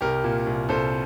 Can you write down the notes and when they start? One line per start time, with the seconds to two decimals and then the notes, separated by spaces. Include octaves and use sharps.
0.01 C2 G4 A#4
0.24 A#2
0.47 C2
0.69 C2 A4 C5